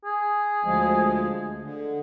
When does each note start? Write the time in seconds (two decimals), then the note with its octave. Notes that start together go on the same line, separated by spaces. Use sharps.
0.05 G#4
0.64 D2 F3 G#3
1.62 D3